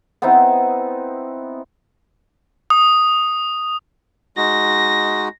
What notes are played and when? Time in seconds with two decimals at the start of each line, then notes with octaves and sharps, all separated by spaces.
0.22 B3 C4 D#4 E4
2.70 D#6
4.37 G#3 D#4 F#4 A#6